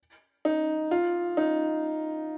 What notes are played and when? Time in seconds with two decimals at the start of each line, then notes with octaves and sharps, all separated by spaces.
0.45 D#4
0.91 F4
1.37 D#4